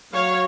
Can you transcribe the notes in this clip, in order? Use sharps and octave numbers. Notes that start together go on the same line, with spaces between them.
F#3 C#5 F5